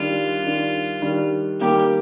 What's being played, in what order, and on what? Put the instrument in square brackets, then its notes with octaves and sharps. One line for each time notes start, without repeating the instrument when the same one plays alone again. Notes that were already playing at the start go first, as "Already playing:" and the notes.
Already playing: [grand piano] D#3 G3 D4 [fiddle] F4
[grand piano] D#3 G3 D4
D#3 G3 D4
[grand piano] D#3 G3 A#3 [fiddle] G4